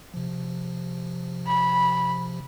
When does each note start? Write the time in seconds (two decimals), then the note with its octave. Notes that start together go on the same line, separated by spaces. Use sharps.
0.14 C3 F3
1.47 B5